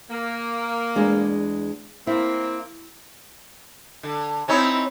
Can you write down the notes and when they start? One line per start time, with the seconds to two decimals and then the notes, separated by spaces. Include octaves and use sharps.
0.11 A#3
0.96 E2 G#3 D4
2.07 A#3 C4 E4
4.03 D3
4.48 C4 C#4 D#4 E4 C#5